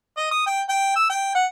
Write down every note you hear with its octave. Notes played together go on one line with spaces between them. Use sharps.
D#5
D#6
G5
G5
E6
G5
F#5